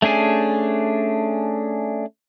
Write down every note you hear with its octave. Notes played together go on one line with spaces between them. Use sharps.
A3 C#4 D4 G#4